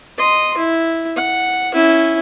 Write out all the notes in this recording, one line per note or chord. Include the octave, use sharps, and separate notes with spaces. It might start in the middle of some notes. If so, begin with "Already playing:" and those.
D#5 C6
E4
F#5
C#4 E4